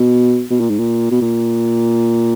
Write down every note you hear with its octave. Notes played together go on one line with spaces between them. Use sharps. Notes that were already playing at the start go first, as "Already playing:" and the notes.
Already playing: B2
B2
A#2
G#2
A#2
B2
A#2